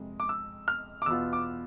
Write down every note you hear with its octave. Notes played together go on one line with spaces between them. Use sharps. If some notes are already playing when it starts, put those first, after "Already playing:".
Already playing: F2 C3 G#3
D6
E6
F6
D6
E2 B2 B3 F4 E6
D6